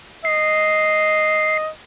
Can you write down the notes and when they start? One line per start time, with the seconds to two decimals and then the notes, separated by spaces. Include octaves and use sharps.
0.25 D#5 C7